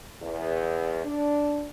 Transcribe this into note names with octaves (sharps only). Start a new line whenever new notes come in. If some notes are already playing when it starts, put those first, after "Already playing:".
E2
D4